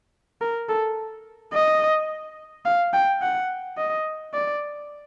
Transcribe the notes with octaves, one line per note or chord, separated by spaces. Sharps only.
A#4
A4
D#5
F5
G5
F#5
D#5
D5